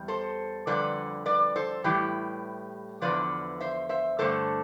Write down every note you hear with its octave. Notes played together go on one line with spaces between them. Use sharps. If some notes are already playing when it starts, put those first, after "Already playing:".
Already playing: E2 G3
A4 C5
F2 D3 G3 B4 D5
B4 D5
A4 C5
A2 E3 G3 G4 B4
E2 D3 F3 B4 D5
C5 E5
C5 E5
G2 D3 A3 A4 C5